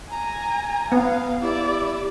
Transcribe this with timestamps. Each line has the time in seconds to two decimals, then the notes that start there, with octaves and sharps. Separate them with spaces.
0.11 G#5 A#5
0.92 B3 F5
1.42 E4 G4 D5